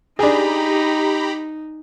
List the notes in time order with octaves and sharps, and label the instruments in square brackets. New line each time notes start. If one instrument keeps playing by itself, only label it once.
[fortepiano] D4 G#4 [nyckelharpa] D#4 [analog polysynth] G4 A#5 B5